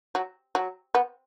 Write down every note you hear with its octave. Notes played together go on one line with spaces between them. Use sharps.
F#3
F#3
B3